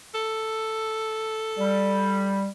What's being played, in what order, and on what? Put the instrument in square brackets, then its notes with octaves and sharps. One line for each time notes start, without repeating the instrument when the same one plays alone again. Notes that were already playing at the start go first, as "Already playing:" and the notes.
[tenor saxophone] A4
[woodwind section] G3